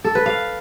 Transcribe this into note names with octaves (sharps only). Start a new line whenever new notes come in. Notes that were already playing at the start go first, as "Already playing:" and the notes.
A4
B4
F5